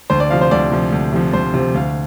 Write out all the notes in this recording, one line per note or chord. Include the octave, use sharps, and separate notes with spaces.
D2 C5
D5
C3 F3 F5
C5
D2 D5
C3 F3
D2
C3 F3
D2 C5
C3 F3
D2 F5